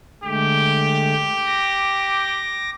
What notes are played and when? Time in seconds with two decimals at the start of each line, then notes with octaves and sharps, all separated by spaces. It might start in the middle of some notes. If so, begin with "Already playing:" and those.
0.24 D3 G#3 A3 G4
1.46 D6 A#6